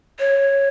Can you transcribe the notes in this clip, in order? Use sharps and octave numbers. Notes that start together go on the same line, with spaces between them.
C#5